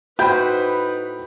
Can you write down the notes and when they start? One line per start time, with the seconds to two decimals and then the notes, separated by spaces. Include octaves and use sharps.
0.19 A2 D#4 F#4 B4 C5 G5 B5 G6